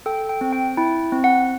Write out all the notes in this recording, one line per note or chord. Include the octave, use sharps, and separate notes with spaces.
A4 G5
G5
C4
G5
E4 G5
C4
F#5